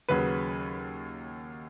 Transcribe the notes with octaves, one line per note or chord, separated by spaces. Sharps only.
D#2 C#3 F#3 B4